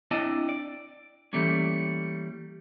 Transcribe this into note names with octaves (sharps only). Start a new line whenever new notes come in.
C4 D4 E4 D5 D#5 A5
D5
E3 G3 A3 A#3 C#4